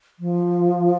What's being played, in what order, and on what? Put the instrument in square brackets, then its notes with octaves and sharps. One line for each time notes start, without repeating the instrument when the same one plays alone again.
[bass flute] F3